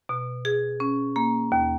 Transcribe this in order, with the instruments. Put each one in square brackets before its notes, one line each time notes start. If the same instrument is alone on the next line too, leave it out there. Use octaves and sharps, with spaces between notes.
[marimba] B2
G#4
C#4
A#3
D#2